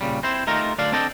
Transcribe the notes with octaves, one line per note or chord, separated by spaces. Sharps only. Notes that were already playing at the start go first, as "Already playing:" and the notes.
A#2 C#3 G3
C4 E4 C5
A3 D#4 F4 G4 A#4
D2 D4 D5 F5
C4 D4 A4 D5 D#5 G5